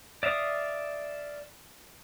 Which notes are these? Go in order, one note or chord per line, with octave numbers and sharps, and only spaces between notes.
D5 E5 F5 D#6